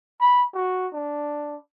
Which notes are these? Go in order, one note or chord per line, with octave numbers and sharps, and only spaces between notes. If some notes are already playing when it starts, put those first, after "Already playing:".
B5
F#4
D4